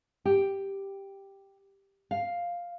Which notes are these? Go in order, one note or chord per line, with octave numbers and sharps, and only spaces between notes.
G4
F5